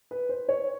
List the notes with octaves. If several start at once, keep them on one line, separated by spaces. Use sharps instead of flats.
B4
C5
C#5